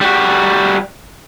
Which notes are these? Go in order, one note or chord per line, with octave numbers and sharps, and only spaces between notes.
G3 F#4